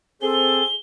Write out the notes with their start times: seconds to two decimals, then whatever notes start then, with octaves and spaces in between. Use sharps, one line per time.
0.22 C4 G#4 A4 G7